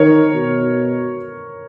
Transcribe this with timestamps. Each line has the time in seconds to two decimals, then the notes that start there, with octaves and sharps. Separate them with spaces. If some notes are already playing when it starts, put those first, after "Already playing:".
Already playing: D#3 A#4 C#5
0.35 B2